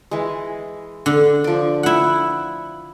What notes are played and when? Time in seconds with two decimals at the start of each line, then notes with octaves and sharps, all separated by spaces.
0.11 E3 G#3
1.06 D3
1.44 F3 D5
1.83 E4 F#5